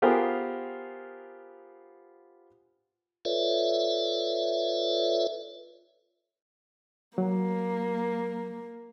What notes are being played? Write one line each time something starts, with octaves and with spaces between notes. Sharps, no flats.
B3 F4 G4 G#4 A#4 C5
F4 A4 B4 C#5 D5 E5
F#3 A#3